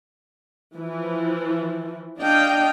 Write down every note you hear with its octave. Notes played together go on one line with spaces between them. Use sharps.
E3 F3
D4 D#5 F5 G5